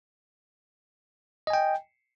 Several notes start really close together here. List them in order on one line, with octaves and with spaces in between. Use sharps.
D#5 G#5 G5